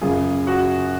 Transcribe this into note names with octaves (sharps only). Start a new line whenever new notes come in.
F#2 C#3 F4 G#4
F#4